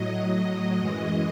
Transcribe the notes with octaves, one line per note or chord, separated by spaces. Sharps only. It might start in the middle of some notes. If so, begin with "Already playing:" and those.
Already playing: A2 F#3 D#5
F#2 E3 G#3